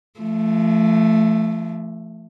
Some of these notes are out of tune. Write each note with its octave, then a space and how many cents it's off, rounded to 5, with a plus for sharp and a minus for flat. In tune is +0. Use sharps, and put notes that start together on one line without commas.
F3 -35 A3 +0